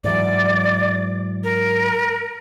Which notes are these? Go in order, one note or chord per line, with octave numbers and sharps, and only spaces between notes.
G#2 E3 F#3 D5
A#4